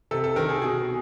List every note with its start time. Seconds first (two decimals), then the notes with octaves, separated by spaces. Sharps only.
0.11 C3 A4
0.24 A4
0.36 D#3 A#4
0.49 G#4
0.62 B2 G#4